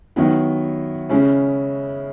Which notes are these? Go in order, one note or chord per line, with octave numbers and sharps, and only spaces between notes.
D#3 F#3 B3 E4
C#3 G#3 C#4 E4